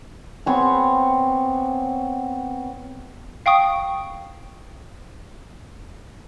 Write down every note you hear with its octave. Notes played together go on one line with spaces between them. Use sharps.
B3 C4 C#5 G#5
F5 G5 C#6 D#6